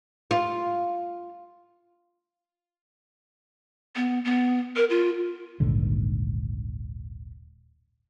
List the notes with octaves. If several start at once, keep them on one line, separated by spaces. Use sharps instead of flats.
F4
B3
B3
A#4
F4
D#1 A#1 G#2 D3